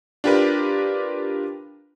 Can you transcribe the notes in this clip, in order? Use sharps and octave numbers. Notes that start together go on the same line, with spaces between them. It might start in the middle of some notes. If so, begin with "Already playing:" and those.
D4 F4 G4 A#4 B4